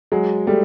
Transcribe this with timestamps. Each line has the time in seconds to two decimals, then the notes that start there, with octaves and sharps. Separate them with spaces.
0.12 F#3 G#3
0.47 G3 A3